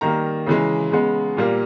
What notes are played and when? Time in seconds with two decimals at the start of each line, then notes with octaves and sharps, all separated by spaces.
0.01 D#3 G3 A#3 A#5
0.46 C#3 E3 G#3
0.92 C#3 G#3 B3
1.37 A#2 G3 A#3